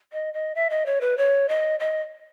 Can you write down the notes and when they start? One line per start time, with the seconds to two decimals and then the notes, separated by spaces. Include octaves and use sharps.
0.13 D#5
0.34 D#5
0.55 E5
0.70 D#5
0.86 C#5
1.01 B4
1.18 C#5
1.49 D#5
1.80 D#5